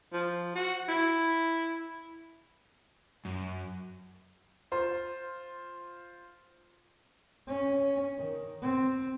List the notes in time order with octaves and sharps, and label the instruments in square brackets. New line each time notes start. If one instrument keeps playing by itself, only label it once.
[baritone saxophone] F3
F#4
E4
[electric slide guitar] F#2
[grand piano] F4 C5 C6
[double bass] C#4
D#3
C4